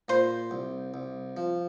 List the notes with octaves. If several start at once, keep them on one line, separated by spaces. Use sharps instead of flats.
A#2 C5
C2
C2
F3